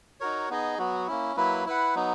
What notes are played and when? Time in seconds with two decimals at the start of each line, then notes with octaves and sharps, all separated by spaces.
0.20 D#4 F#4 A#4 C#5
0.49 B3 D#4 G#4 D#5
0.78 F#3 B3 F#4
1.08 A#3 C#4 E4
1.36 F#3 A#3 E4 B4
1.66 E4 B4 F#5
1.95 F#3 B3 D#4